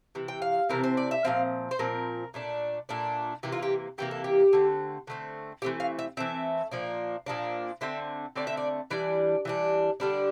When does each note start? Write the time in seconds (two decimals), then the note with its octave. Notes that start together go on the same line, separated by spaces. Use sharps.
0.15 C3 E3
0.28 G5
0.42 F5
0.69 C3 E3 A3 C4 A#4
0.84 C5
0.97 D5
1.11 E5
1.24 A#2 F3 C4 F5
1.71 C5
1.79 A#2 F3 C4 A#4
2.34 A#2 A3 D4
2.89 A#2 A3 D4
3.43 C3 E3 A#3 G4
3.52 F4
3.63 G4
3.98 C3 E3 A#3 G4
4.11 A4
4.24 G4
4.53 D3 A3 C4
5.07 D3 A3 C4
5.62 E3 A3 C4 G4
5.80 F5
5.99 E5
6.17 E3 A3 C4 E5
6.71 A#2 F3 A#3 D4
7.26 A#2 F3 A#3 D4
7.81 D3 A3 C4 E5
8.36 D3 A3 C4 D5
8.47 E5
8.57 D5
8.91 E3 G3 D4 D5
9.45 E3 G3 D4
10.00 D3 G3 D4